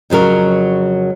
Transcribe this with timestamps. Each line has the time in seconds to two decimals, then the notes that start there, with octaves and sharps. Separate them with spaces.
0.10 F2 C#3 F#3 A#4